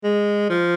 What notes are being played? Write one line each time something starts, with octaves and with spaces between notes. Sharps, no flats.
G#3
F3